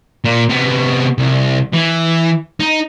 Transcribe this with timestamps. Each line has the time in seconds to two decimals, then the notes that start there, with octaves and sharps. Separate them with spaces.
0.24 A#2
0.49 C3 B3
1.18 C2
1.73 E3
2.60 D#4